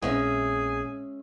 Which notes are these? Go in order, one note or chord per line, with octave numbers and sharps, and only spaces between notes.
A#1 A#2 G#3 C4 C#4 G#4 E5